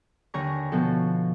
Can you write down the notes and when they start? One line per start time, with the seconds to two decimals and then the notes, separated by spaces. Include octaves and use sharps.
0.34 D#2 D3 C#5 G#5 A#5 C#6
0.72 B2 F3 A4